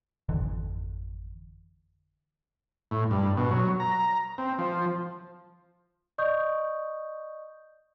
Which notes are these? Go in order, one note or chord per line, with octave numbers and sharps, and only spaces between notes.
G#1 F2 D3 E3
A2
G2
B2
F#3
A#5
C4
F3
D5 D#5 C#6 D#6 G6